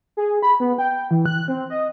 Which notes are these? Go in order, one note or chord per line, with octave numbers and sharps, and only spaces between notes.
G#4
B5
B3
G5
E3
F#6
C4
D#5